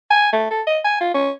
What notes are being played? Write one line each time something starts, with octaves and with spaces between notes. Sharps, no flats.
G#5
A3
A4
D#5
G#5
F4
C#4